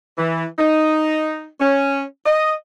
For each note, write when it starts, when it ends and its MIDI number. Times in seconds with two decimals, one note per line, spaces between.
0.18 0.45 52
0.59 1.47 63
1.60 2.03 61
2.25 2.53 75